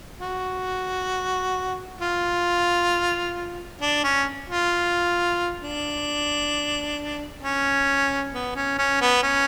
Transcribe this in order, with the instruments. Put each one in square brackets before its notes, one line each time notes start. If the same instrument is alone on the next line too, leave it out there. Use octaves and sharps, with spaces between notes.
[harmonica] F#4
F4
D4
C#4
F4
D4
C#4
B3
C#4
C#4
B3
C#4